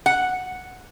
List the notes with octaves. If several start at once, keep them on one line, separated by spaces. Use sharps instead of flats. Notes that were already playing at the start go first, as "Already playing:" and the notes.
F#5